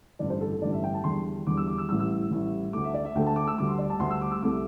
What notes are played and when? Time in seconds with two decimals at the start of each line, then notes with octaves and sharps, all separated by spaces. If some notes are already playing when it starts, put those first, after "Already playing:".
0.19 A1 G2 D3 D5
0.30 C5
0.41 A4
0.52 A4
0.62 A1 G2 D3 D5
0.73 E5
0.84 G5
0.94 A5
1.04 E2 D3 G3 C6
1.47 E2 D3 G3 D6
1.57 E6
1.67 D6
1.78 E6
1.89 A1 A2 G3 E6
1.99 E6
2.31 A1 A2 G3
2.73 D2 D3 A3 D6
2.84 E5
2.94 D5
3.05 E5
3.15 D2 D3 A3 G5
3.27 A5
3.36 D6
3.47 E6
3.58 D2 D3 G3 D6
3.68 C6
3.78 D5
3.90 A5
4.00 D2 D3 G3 C6
4.10 E6
4.21 D6
4.31 E6
4.42 C2 C3 A3 D6